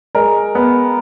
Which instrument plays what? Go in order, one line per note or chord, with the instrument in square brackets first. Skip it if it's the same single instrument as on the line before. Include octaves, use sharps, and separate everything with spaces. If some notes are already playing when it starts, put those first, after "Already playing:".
[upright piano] G#3 [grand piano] A#4
[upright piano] B3